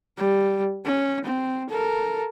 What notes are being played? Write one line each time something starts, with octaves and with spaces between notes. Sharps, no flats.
G3
C#4
C4
A4 A#4